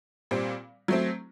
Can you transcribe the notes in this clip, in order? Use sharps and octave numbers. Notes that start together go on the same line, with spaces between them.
A#2 G3 C4
F#3 A3 C4